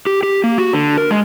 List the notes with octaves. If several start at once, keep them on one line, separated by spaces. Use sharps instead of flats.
G4
G4
A#3
F#4
D3
A#4
G#3